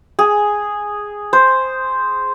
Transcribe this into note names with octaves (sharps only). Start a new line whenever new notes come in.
G#4
C5